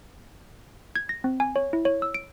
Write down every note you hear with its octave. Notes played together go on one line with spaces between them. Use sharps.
G#6
A#6
C4
G#5
C#5
E4
C#5
E6
D7